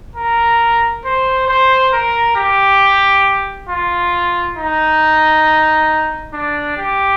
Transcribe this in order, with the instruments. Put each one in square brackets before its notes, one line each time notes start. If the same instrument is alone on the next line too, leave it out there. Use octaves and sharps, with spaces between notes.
[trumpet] A#4
C5
C5
A#4
G4
F4
D#4
D4
G4